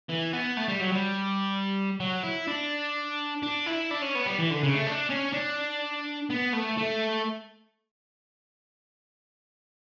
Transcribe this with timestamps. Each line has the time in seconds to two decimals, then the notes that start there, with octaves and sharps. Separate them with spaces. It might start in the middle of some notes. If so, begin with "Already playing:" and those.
0.09 E3
0.33 B3
0.57 A3
0.69 G3
0.80 F#3
0.92 G3
2.00 F#3
2.23 E4
2.48 D4
3.43 D4
3.67 E4
3.91 D4
4.02 C#4
4.15 B3
4.26 G3
4.38 E3
4.50 D3
4.63 C#3
4.75 A3
4.87 D4
5.10 C#4
5.33 D4
6.30 B3
6.53 A3
6.78 A3